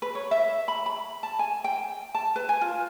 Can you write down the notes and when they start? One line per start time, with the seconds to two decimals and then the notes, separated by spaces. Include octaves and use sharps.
0.02 B4
0.15 C#5
0.31 E5
0.68 B5
0.86 B5
1.23 A5
1.39 G#5
1.64 G5
2.15 A5
2.36 B4
2.49 G#5
2.61 F4